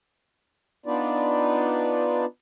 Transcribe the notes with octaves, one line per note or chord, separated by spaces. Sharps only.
B3 D4 D#4 F4 B4 D5